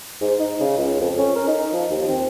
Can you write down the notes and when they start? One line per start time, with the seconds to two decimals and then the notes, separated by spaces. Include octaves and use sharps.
0.21 G#2
0.40 D#4
0.60 C#3
0.77 C#2
1.00 F2
1.18 C#4
1.36 A#4
1.48 D#4
1.73 F3
1.90 D#2
2.08 C4